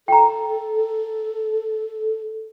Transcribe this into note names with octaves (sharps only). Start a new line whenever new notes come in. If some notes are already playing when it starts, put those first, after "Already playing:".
A4 G5 A#5